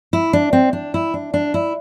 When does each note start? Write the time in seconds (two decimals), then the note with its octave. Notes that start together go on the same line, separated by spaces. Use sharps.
0.13 E4
0.33 D4
0.53 C4
0.73 D4
0.94 E4
1.14 D4
1.34 D4
1.54 E4